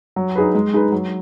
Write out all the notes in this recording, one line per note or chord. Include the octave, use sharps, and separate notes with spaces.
F#3
D#4 G#4 B4
G#3
D#4 G#4 B4
F#3